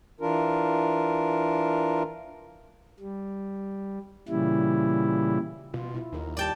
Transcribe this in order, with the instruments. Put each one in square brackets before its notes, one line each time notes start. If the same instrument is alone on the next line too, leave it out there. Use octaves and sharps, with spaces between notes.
[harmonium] E3 D4 F4 A#4
[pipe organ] G3
A#2 C#3 E3 G3 E4
[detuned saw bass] B2 [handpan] F4
[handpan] E4 F4
[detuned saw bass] D#2 [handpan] D#4 A#4
[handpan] G3 G4 [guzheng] D5 G5 A5